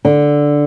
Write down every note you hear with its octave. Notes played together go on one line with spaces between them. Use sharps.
D3